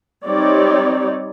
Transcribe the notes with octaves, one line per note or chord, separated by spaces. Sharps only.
G3 C4 D#4 G4 C#5 D5